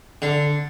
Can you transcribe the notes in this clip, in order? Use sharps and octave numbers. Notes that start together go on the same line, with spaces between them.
D3